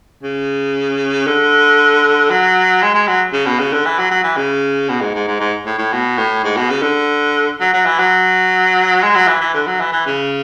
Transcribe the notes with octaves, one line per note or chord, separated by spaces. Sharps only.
C#3
D3
F#3
G#3
G#3
F#3
C#3
B2
C#3
D3
E3
F#3
F#3
E3
C#3
B2
G#2
G#2
G#2
G#2
A2
A2
B2
A2
G#2
B2
C#3
D3
F#3
F#3
E3
F#3
G#3
F#3
E3
E3
D3
F#3
E3
E3
C#3